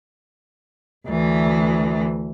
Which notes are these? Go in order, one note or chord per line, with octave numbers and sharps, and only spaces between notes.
D2 E3